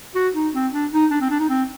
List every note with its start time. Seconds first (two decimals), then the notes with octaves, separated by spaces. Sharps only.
0.15 F#4
0.35 D#4
0.54 C4
0.73 D4
0.92 D#4
1.11 D4
1.21 C4
1.31 D4
1.40 D#4
1.50 C4